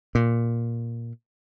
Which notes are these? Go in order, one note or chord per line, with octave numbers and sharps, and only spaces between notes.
A#2